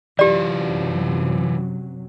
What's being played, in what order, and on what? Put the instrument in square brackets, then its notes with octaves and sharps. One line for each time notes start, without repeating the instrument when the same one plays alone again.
[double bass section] F#2 C3 F#3 [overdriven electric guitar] E3 F4 [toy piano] G4 D5